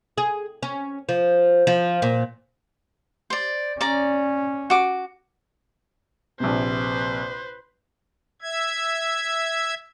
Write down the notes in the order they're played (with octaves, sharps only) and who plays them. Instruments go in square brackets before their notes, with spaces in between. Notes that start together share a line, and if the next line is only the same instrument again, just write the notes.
[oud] G#4
C#4
F3
F3
A#2
[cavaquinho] C5 D5
[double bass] C#4 [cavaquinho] D5 A#5
[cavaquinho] F#4 D6
[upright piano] A#1 C3 [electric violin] B4 C5
[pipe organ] E5 G#6